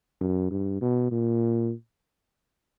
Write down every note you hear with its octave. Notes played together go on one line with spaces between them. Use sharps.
F#2
G2
B2
A#2